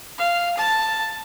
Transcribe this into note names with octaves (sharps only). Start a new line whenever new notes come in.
F5
A5